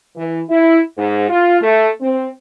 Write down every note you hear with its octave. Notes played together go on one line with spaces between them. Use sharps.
E3
E4
G#2
F4
A3
C4